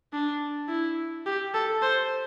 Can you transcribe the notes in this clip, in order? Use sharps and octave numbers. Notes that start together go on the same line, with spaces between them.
D4
E4
G4
A4
C5